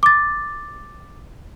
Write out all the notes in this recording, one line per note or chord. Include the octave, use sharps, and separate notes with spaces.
D6 A6